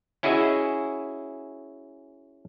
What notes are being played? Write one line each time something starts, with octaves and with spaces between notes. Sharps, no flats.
C#4 E4 F#4 G#4 D#5 E5